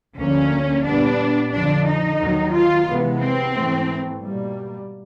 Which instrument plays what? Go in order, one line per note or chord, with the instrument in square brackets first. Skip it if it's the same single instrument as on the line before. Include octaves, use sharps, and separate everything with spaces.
[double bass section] D2 D3 F3 A#3 [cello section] C#4
[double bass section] A#2 G3 B3 [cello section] D4
[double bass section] F2 D3 F3 [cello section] D4
[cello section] D#4
[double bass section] D#2 D#3 F#3
[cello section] F4
[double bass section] C3 E3 G#3 B3
[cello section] C4
[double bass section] G#2 E3 A3
B2 G3 A#3